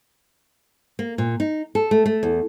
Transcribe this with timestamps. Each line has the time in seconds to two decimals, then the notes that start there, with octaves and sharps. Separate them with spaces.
0.99 A#3
1.18 A#2
1.40 D#4
1.75 A4
1.91 A3
2.06 A3
2.23 E2